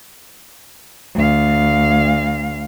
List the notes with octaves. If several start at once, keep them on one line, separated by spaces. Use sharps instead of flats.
D2 F5